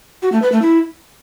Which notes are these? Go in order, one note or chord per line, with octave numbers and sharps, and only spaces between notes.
F#4
A3
B4
A3
E4